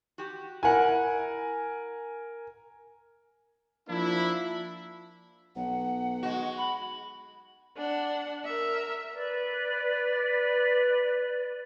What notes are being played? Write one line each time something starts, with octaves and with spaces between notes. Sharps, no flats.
F#4 G4
E4 A#4 F#5 G#5
F3 A#3 D4 E4
B1 F#5
G#3 F#4
B5
D4 F#5
A#4 E5
B4 D5